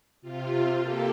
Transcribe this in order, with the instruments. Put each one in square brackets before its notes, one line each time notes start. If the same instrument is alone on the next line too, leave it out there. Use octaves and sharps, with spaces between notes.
[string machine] C3 F4
A#3 G4 A4